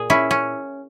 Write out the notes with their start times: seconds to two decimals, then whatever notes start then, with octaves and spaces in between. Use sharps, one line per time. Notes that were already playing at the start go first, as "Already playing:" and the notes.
Already playing: A#2 G#4
0.10 C#4 E4
0.31 C#4